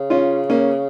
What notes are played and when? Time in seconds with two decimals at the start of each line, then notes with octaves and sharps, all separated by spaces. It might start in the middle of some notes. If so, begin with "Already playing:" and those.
Already playing: C#3
0.10 C#4 F4
0.50 A#3 C#4